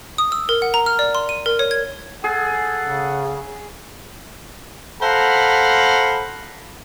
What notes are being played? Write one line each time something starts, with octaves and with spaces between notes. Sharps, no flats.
D#6
E6
A#4
F#5
A#5
F6
D5
C6
D#7
A#4
C#5
G#6
G#4 A4 F#5
C#3
A4 C5 F5 F#5 A#5 B5